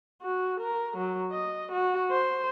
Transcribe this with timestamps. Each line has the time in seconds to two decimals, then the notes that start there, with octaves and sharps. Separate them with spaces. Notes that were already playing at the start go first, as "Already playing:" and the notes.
0.22 F#4
0.60 A#4
0.97 F#3
1.32 D#5
1.72 F#4
2.11 C5